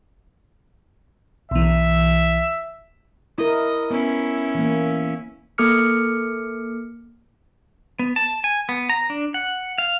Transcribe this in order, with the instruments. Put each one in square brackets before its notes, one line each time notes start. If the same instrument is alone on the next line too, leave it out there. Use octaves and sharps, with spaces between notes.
[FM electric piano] B1 E3 [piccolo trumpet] E5
[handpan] E4 A#4 [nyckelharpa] D#5
[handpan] B3 [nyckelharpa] C#4 E4
[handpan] E3 A#3
[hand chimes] A#3 A4 D6 F6 C#7
[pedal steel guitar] B3
A5
G#5
B3
A#5
D4
F#5
F5